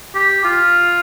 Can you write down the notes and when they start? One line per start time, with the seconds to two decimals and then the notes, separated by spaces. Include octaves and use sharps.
0.15 G4
0.44 F4